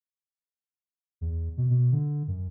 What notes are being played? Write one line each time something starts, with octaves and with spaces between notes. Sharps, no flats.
E2
B2
B2
D3
F#2